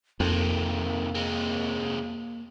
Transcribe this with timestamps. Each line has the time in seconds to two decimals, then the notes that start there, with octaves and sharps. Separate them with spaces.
0.20 F2 C3 D#3 A#3
1.15 C3 G#3